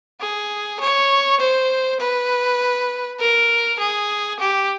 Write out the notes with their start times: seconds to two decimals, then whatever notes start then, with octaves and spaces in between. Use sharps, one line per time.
0.21 G#4
0.80 C#5
1.40 C5
2.00 B4
3.20 A#4
3.79 G#4
4.40 G4